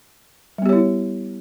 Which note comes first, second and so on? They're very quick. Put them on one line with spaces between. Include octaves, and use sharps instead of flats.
G3 B3 G4 C#5 E4